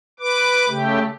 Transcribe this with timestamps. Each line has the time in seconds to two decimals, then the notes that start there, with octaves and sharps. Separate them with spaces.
0.20 B4 D6
0.68 C#3 A3 G4